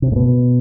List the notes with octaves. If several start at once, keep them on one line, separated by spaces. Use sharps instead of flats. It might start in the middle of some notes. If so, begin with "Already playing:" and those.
C3
A2
B2